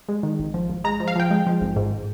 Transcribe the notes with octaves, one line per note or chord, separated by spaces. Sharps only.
G#3
D#3
G#1
F3
G#1
G#3 A#5
F3
F5
F3 G5
G#3
F3
G#1
G#2